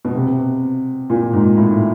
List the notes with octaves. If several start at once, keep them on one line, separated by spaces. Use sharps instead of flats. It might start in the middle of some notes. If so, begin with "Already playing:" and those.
B2
C3
A#2
G#2
A2